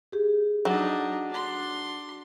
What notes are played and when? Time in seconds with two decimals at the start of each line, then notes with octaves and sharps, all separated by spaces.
0.12 G4 G#4
0.65 F#3 D4 D#4
1.30 D4 C6